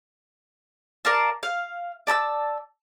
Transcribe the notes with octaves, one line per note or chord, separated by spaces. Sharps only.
A#4 D5 F5 A5
F5
D5 A5 A#5 E6